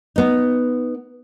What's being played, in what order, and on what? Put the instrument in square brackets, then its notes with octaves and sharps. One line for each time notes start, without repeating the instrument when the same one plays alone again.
[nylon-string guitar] B3 D#4